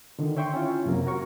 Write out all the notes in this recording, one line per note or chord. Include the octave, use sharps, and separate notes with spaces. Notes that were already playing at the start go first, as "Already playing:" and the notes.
D3 D#3
C#5 E5 G5 C6 C#6
C#4 E4 F4
F#2 C3 F#3 A#3 A#4
F#4 A#4 C#5 C#6